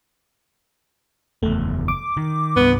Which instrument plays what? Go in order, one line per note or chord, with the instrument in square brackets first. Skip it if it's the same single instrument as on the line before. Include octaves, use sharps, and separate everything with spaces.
[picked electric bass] F#1 E2 [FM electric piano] A3
[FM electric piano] D6
[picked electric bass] D#3
[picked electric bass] C2 G2 [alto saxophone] B3